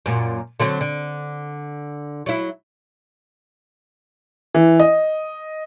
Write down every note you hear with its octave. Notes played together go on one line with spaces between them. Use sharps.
F#2 A#2
D3 F#3 C4
D3
F#3 E4
E3
D#5